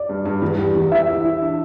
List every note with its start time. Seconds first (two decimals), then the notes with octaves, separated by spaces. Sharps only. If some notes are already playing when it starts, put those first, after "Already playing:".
Already playing: D5
0.09 G2
0.25 G2
0.42 E2
0.59 G4
0.75 E2
0.92 E3 E5
1.08 E3
1.25 E3
1.41 D4